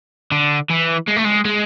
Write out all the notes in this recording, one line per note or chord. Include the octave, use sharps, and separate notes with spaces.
D3
E3
G#3
A3
G#3
G#3